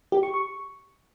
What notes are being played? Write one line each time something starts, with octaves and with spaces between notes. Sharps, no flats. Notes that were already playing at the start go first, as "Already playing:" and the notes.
G4
C#6
C#6